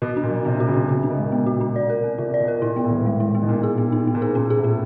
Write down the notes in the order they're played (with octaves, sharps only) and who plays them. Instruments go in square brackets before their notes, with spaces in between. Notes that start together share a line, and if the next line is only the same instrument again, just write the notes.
[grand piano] B2 [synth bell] F#4
[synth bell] D4
[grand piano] A#2
[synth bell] F#3
[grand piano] C3 [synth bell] B3
[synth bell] F#4
[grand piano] C#3
[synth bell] D4
[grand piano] C#3 [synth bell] F#4
[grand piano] C3
[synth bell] D4
[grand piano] B2
[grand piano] A#2 [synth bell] G#3
[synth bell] B3
F#4
D4
D5
A#4
C4
[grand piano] C3 [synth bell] F4
[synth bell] D5
[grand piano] B2
[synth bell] A#4
[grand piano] A#2 [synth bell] E4
[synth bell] B3
[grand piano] A2
[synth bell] D#3
G#3
E4
B3
[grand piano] B2
[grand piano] A#2 [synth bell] B3
[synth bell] G#4
B3
D#4
B3
[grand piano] A#2
[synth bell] G#4
[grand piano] A#2 [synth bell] C#4
[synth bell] G#4
[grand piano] A2
[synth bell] C#4